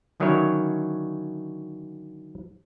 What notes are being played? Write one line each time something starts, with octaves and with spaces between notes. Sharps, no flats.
D3 D#3 F#3 C#4 E4 C#5